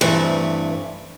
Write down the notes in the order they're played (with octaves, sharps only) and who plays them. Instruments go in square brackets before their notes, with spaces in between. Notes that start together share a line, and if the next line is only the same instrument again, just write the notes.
[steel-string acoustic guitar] G2 [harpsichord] C3 E3 A3